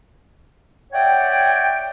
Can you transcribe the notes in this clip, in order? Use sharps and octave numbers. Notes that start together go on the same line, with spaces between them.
C#5 D5 E5 F#5 G5